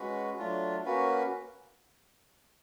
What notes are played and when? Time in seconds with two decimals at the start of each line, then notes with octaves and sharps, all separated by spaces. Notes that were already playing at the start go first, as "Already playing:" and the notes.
Already playing: G#3 C#4 F#4 B4
0.39 F#3 A3 D4 F4
0.85 A#3 C#4 F#4 B4